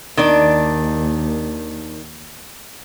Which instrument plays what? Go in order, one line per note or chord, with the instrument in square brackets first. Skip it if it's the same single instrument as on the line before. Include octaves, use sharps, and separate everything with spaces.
[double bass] D#2 [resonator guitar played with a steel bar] D#3 D4